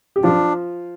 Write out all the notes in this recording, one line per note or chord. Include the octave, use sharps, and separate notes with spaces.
G4
F3 D4 F4